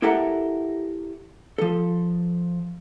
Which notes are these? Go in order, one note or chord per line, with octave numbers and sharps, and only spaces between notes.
E4 G4 A4 A#4 E5 F#5
F3 A4